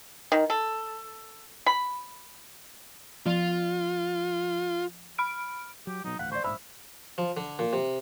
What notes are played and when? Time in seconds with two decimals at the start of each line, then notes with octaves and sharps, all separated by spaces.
0.32 D#3
0.50 A4
1.66 B5
3.26 F3 F4
5.18 B5 F6 D7
5.87 F#3 G4
6.04 B2 F#3 D#4
6.19 D#1 A1 D2 F5 F#5
6.32 C5 D5 C#6
6.44 A#1 G#2 C5 E5 B5 D#6
7.18 F3
7.37 D3
7.59 A#2
7.73 C3